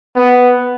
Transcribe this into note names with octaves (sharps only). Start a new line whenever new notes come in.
B3